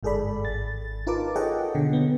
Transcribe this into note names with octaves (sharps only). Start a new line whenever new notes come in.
G1 G#2 G#4 A4 D5 B5
G#1 A6
D#4 F4 A#4 B4 A5 D6
G#4 A4 C#5 D#5 F#5 G5
B2 D3
D3 B3